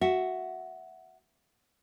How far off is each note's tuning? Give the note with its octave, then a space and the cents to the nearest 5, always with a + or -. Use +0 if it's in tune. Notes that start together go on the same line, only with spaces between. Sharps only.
F#4 +0 E5 +0